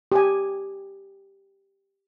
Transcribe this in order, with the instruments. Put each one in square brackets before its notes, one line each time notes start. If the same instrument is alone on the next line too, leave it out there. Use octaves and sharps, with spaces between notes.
[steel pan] G4 G#5